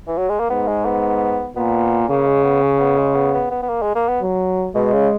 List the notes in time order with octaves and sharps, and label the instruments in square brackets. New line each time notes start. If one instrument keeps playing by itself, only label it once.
[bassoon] E3
F#3
G#3
A#3
[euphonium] G#2 [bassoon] B3
[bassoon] G#3
B3
[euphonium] A#2 [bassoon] B3
[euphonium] C#3 [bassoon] A#3
[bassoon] G#3
B3
C#4
B3
G#3
B3
B3
B3
B3
A#3
G#3
A#3
B3
[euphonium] F#3
[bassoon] B2 [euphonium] G#3
[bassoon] C#3